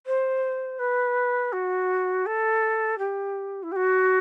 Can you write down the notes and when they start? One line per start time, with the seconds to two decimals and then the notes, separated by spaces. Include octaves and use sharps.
0.07 C5
0.79 B4
1.52 F#4
2.26 A4
2.98 G4
3.63 E4
3.72 G4
3.76 F#4